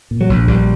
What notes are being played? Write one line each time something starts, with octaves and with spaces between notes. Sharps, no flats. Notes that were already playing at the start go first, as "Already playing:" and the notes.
A#2
F#3
A#1
A#1 G3